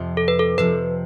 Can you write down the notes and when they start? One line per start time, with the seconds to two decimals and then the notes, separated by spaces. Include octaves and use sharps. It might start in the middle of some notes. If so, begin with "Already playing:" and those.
Already playing: F2 C3 F3
0.17 A4
0.28 B4
0.39 A4
0.58 F2 C3 F3 B4